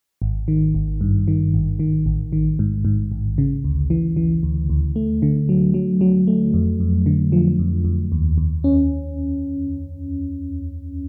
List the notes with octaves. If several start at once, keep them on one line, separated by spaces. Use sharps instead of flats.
G#1
D#3
G#1
G2
D#3
G#1
D#3
A1
D#3
G#2
G#2
A1
C#3
D2
E3
E3
D2
D2
A3
D3
F#3
F#3
F#3
A3
F2
F2
D3
F3
F2
F2
D#2
D#2
C#4